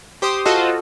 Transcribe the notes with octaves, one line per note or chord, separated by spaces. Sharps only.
G4 C5 C6 D#6
F4 F#4 A4 C5 D#5